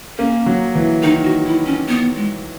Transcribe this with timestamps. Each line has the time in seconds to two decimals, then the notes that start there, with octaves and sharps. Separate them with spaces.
0.18 A#3 C#4
0.46 F#3
0.75 E3
1.03 D#3 D#4
1.24 F#4
1.45 E4
1.66 C#4
1.88 B3
2.16 G#3